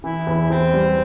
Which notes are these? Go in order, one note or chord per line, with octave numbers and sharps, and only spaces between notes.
E3 E4
E2
E2 C4
G3